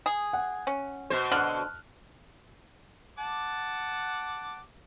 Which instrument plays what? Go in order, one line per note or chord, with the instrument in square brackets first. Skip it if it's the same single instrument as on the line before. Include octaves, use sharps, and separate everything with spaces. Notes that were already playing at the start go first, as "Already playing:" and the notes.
[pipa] G#4
[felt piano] F#5
[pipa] C#4
[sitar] B2 C5
[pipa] D3 [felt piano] F6 F#6
[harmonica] F#5 A5 D6